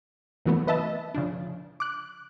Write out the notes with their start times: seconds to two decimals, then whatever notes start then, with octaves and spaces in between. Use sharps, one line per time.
0.45 D#3 E3 F#3 A3 B3
0.67 B4 D#5 E5 A5
1.14 C#3 F3 D4
1.80 D6 F#6